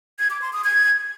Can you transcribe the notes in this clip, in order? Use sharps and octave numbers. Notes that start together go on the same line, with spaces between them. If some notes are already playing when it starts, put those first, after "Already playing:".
G#6
D6
C6
D#6
G#6